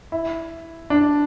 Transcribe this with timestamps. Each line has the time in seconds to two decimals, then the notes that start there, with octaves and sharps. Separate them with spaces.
0.12 E4
0.90 D4